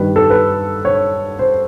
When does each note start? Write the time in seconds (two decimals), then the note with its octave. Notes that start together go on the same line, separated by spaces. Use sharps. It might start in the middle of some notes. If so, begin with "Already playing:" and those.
Already playing: G2 D#3 G3 B4
0.16 A4
0.30 B4
0.85 C#5
1.39 C5